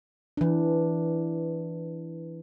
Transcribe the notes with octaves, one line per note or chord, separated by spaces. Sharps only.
E3 D4